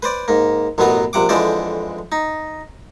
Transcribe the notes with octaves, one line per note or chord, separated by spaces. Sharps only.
B4 C5 D5
G#2 A#3
A1 F#2 B2 F#3 B3 B4
A#1 C3 F#5 D6
F2 D3 E3 G#3 C5 D5
D#4